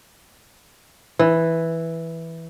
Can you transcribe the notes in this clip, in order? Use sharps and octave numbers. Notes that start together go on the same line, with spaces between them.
E3